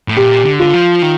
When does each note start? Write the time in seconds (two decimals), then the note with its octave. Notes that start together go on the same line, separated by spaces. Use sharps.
0.08 A2
0.16 A#2 G4
0.45 D3
0.60 F4
0.74 F3
1.02 D#3